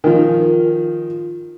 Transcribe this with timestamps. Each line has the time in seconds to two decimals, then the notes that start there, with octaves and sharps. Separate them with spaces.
0.04 D#3 F3